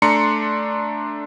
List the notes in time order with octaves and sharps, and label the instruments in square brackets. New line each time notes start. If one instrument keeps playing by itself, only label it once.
[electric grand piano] A3 D4 A#5 C6 C#7